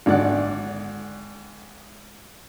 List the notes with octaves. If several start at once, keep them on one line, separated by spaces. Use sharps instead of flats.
G#1 D3 D5 F#5